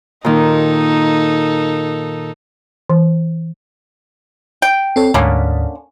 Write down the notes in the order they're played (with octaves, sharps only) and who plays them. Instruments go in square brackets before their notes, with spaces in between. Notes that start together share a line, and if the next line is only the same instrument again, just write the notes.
[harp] A#2 D#3 [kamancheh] D#4 A4
[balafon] E3
[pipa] G5
[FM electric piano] C4 A4 C#5
[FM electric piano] D2 G#2 [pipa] D3 A#3 C#4